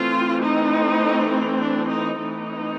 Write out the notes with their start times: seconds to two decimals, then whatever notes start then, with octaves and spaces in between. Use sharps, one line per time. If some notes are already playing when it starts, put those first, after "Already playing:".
Already playing: E3 A3 C4 F4
0.41 D#4
1.59 D4
1.88 D#4
2.18 E3 A3 C4 D#4